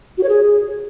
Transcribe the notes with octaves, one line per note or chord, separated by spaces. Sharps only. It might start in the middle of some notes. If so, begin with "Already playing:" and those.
F#4
C#5
G#4